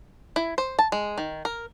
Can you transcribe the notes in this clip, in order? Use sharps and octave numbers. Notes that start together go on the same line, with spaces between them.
E4
C5
A5
G#3
D#3
A#4